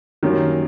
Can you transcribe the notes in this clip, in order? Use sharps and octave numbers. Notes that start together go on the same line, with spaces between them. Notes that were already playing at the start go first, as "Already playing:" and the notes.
F#2 D#3 G3 A#3 C#4